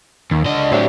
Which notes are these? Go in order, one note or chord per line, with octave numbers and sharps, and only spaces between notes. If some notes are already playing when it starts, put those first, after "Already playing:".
D#2
C#2 D3 D#5
A2 C3 F#3 D4